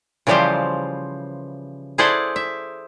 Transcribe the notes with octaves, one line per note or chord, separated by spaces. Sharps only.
C#3 E3 F3 G3 G4 C5
E4 G#4 A4 C5 D5 F#5
E5